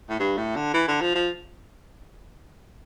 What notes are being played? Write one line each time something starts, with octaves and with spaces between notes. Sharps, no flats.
A2
G2
A2
D3
E3
D3
F3
F3